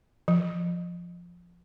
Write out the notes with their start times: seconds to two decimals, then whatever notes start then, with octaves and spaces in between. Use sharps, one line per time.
0.28 F3